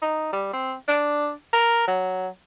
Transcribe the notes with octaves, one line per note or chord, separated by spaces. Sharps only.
D#4
G3
C4
D4
A#4
F#3